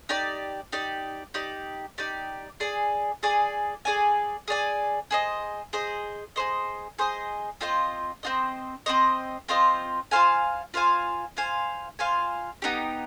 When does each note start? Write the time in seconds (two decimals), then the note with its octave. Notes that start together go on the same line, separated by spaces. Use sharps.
0.09 D#4 G4 D5
0.72 D#4 G4 D5
1.34 D#4 G4 D5
1.98 D#4 G4 D5
2.60 G#4 D5 G#5
3.23 G#4 D5 G#5
3.85 G#4 D5 G#5
4.48 G#4 D5 G#5
5.11 G#4 C5 D#5
5.73 G#4 C5 D#5
6.36 G#4 C5 D#5
6.98 G#4 C5 D#5
7.61 C4 F4 C5 D#5
8.23 C4 F4 C5 D#5
8.86 C4 F4 C5 D#5
9.49 C4 F4 C5 D#5
10.11 F4 C5 F5 G#5
10.74 F4 C5 F5 G#5
11.37 F4 C5 F5 G#5
11.99 F4 C5 F5 G#5
12.62 B3 D#4 G4